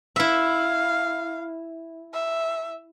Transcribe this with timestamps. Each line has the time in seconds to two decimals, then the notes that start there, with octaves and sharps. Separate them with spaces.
0.16 E4 E5 F5
2.13 E5